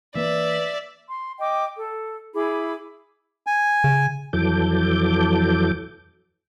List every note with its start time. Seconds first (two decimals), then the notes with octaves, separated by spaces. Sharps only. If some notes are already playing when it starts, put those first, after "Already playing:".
0.15 E3 A#3 B4 D5 E5
1.09 C6
1.40 D#5 G5 D6
1.75 A4
2.34 E4 G#4 B5 D6
3.47 G#5
3.84 C#3
4.33 F2 E3 F#3 A4 D6 G6